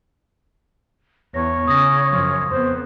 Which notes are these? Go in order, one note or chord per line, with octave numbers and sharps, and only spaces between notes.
E2 C#5 A#6
C#3 D#6 A#6
F#2 F3
F2 B3 C5